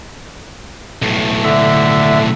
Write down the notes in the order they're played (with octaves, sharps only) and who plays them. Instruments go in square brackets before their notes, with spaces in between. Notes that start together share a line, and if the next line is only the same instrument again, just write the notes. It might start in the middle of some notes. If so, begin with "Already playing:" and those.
[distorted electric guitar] B1 A2
[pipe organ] D3 E5